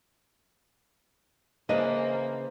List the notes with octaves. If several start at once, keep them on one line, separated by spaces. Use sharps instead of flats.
C#3 E3 A#3 D4 C5 D#5